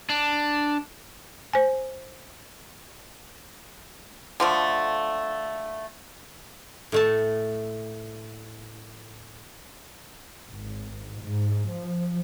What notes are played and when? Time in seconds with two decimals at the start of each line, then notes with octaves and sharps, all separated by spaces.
0.09 D4
1.53 C5 G#5
4.40 D3 F3 A3
6.92 A2 A3 A5
10.49 G#1
11.22 G#2
11.70 F3